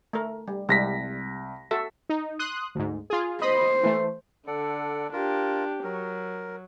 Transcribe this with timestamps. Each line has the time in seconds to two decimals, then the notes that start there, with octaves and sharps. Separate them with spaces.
0.13 A3 A#4
0.48 G3
0.69 C2 G3 G#3 C4 A#6 B6
1.71 F#4 A4 E5
2.10 D#4
2.39 C6 D#6 F#6
2.75 D2 G#2
3.10 F4 G#4
3.42 C5 D#5 B5 D#6
3.83 E3 A3
4.47 D3 A4 D5 F#5
5.13 D4 F4 G4 A#4
5.84 F#3 A#4